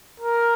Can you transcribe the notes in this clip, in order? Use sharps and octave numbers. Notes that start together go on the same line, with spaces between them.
A#4